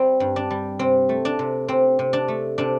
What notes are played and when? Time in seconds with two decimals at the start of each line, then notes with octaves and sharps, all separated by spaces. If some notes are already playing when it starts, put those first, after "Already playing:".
Already playing: G3 C4
0.20 G2
0.36 D4
0.50 G3
0.79 C3 C4
1.09 A3
1.25 D4
1.39 C3
1.68 C3 C4
1.99 C3
2.13 D4
2.28 A3
2.58 C3 D4